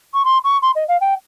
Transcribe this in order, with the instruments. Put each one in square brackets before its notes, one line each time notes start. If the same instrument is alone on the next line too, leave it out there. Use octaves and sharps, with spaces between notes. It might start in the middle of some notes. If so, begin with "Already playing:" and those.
[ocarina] C#6
C6
C#6
C6
D#5
F5
G5